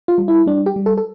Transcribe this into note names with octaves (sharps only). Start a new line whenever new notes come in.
F4
G3
E4
G3 D4
G4
G3
A4
A4